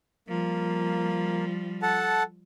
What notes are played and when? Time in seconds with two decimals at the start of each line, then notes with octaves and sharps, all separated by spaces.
0.28 F3 G3 A#3
1.82 A4 F#5 A5